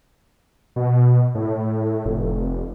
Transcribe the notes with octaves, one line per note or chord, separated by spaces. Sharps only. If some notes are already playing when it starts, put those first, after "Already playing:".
B2
A2
F1